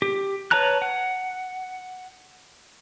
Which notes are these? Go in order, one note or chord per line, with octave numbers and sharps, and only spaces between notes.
G4
B4 C#5 A5 A#5 F#6
F#5